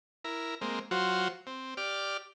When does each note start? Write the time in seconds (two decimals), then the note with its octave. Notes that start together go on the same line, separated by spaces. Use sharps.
0.24 E4 A#4
0.61 G#3 A#3 C4
0.91 F#3 F4 F#4 C5
1.47 C4
1.77 G4 D5 F6